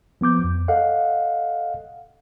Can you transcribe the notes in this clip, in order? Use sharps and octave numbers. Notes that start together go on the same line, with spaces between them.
F3 B3 D6 G6
F2
A4 D#5 F5 F#5